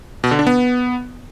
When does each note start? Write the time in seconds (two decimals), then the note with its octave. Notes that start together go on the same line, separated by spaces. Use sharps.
0.24 B2
0.31 D3
0.39 D4
0.47 B3